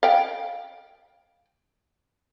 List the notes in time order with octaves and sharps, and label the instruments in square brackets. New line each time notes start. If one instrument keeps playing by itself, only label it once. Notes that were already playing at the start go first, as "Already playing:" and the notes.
[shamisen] F5 G5